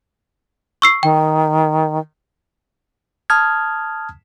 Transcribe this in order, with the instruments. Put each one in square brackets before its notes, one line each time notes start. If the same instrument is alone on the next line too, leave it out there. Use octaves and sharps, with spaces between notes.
[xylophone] C#6 E6 C7
[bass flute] D#3 [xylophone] G5
[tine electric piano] A5 D#6 F6 G#6